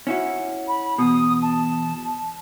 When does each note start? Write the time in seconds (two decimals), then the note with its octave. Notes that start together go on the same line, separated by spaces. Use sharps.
0.07 C#4 E4 F#4
0.68 B5
0.98 E2 B2 D#6
1.43 A5